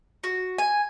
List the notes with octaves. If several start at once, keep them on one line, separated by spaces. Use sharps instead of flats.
F#4
G#5